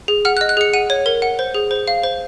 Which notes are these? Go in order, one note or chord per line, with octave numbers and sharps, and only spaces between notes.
G#4
F#5 F6
F#6
D#5
F#6
G#4 C#7
F#5 D#7
C#5
A#4
F#5
C5
G#4
C5
F5
C5